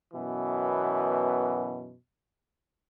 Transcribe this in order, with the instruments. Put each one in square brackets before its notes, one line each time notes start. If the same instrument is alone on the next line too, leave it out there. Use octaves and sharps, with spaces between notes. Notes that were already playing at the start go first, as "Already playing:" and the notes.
[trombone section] F#2 B2 E3 B3